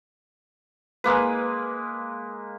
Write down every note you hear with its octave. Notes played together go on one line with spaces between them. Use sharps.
G#3 A#3 B4